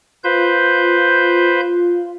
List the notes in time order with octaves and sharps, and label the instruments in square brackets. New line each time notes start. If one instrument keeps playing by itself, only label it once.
[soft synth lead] F4 [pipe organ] B4 C5 G6